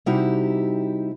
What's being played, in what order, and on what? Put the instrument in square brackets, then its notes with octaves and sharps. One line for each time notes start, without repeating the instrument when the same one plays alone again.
[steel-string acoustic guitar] C3 G3 D#4 E4 F#4 G4